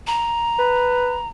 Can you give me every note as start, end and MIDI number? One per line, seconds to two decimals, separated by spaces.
0.07 1.28 82
0.59 1.19 71